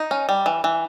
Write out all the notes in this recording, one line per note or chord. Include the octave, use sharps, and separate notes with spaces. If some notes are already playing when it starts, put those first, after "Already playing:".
Already playing: D#4
C#4
G3
E3
E3